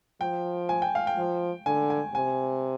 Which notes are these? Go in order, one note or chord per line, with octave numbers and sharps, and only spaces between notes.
F3 G5
G#5
G5
F5
G5
F3
D3 G#5
G#5
C3 G#5